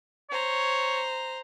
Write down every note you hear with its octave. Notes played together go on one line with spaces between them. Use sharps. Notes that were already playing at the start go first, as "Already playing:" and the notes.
C5 C#5 A#5